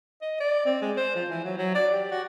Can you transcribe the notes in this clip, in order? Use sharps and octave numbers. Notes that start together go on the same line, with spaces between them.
D#5
D5
C4
G#3
C5
F3
E3
F#3
F#3
D5
G4
F#4